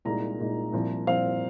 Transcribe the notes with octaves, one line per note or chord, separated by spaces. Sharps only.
C2 A#2 G#3 D#4 A#5
C2 A#2 G#3 D#4
C2 A#2 F3 C4
C2 A#2 F3 C4 F5